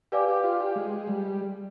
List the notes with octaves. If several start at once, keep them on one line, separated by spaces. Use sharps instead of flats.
G4 B4 D5 F5 G#5 D6
G4
F4
G4
G#3
G3